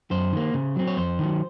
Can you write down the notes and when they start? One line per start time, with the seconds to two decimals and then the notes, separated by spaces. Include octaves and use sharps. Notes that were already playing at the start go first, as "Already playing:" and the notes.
0.11 F#2 C5
0.33 D#3 A#3
0.54 C#3
0.76 F#3 C4
0.87 C#5
0.97 F2 C5
1.19 D#3 F#3